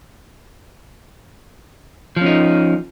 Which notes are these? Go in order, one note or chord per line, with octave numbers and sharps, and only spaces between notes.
F3 C#4 D#4